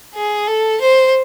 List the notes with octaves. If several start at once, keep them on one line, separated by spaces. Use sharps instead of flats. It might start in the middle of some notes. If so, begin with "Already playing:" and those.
G#4
A4
C5